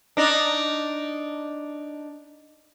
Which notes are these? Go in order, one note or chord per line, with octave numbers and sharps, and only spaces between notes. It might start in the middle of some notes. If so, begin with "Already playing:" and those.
D4 D#4